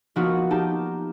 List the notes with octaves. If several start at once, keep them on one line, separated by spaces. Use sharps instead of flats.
F3 A#3 B3 D#4 F4 F#4
D#4 G4 A5